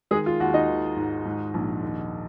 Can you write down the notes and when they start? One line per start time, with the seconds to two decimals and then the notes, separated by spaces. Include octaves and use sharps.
0.11 D#3 G#3 G#4
0.26 F4
0.40 D#2 F#4
0.54 D#4 D#5
0.68 D#3
0.96 G#2
1.25 G#2
1.54 A#1
1.82 D#2